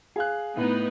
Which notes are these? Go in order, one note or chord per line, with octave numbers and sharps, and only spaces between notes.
G#4 F5 F#6
A2 B3 D#4 B4